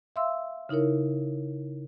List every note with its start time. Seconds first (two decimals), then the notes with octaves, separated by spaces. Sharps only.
0.16 E5 F5 C6 E6
0.69 C#3 D#4 E4 A#4 C#5